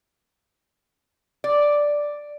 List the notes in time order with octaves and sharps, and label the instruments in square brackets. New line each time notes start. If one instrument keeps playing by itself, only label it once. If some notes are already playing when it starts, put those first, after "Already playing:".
[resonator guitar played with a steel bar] D5